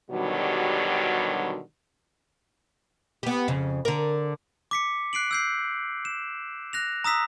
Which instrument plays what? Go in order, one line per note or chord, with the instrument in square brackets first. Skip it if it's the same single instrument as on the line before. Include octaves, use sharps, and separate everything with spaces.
[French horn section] B2 D3 D#3 F#3 G3
[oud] B3 G4
F2 C#3
D3 A#4
[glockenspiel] D6 B6 C#7
F#6 C7 D7 F#7
E6 G6 C7
E7
F#6 A#6 F7
A#5 D#6 E6 B6